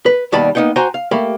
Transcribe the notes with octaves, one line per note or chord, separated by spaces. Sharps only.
B4
D#2 B2 G3 D5 A5 B5
A#3 B3 D#4 F#5 G5
F#4 C5 G5 G#5 A#5
F5
A3 A#3 G4 B5